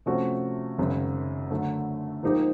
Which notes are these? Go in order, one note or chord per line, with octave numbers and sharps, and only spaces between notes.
C3 F3 A3 C#4 F#4
G#1 F#2 C#3
D3 F#3 A3
G#2 F3 A#3 D#4 G4